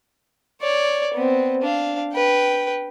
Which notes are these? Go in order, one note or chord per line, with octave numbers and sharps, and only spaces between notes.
C#5 D5
B3 C4
D4 F5
B4 G5